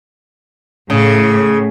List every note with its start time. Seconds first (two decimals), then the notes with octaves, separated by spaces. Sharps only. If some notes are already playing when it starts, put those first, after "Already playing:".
0.90 A2 C#3